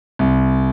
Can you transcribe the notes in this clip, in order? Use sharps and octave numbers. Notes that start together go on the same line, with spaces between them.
C2